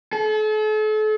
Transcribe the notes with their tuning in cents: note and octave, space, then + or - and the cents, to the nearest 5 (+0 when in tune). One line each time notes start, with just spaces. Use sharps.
A4 -40